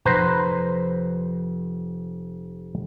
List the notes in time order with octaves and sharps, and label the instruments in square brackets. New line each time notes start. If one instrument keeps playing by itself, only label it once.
[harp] F1 [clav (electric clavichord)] B4 C5 A#5